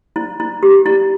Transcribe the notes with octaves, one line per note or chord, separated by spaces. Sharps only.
E4
E4
G4
E4